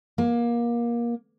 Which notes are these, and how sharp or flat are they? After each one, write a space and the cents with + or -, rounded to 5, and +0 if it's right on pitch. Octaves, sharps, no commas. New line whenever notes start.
A#3 +25